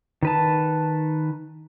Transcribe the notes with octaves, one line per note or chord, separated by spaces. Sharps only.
D#3 B4 A5